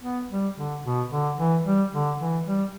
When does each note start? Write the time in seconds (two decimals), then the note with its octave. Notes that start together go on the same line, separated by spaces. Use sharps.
0.02 B3
0.29 G3
0.56 D3
0.83 B2
1.10 D3
1.37 E3
1.65 G3
1.92 D3
2.19 E3
2.45 G3